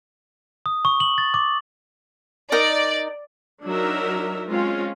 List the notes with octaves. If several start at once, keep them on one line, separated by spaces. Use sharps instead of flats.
D#6
C#6
F#7
A6
D6
D#4 A#4 D5
F#3 D4 D#4 A#4 E5
G#3 C4 C#4 F4